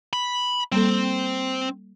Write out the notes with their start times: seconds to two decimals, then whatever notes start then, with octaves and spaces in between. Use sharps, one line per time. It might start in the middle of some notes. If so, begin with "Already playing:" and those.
0.13 B5
0.72 G3 A#3 C4 A4